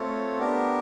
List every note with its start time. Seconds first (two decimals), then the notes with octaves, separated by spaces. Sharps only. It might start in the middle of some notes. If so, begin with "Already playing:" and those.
Already playing: A3 C4 F4 A4 C#5
0.39 B3 D4 G4 A#4